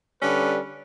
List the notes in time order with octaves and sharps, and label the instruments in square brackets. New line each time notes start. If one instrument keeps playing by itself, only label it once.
[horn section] D3 G3 C#4 B4